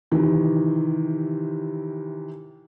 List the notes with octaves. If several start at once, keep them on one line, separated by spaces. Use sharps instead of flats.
C3 D#3 E3